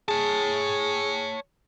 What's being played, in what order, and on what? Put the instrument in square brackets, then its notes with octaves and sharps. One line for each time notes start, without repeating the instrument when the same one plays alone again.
[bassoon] G#4 [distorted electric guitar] C#5 A5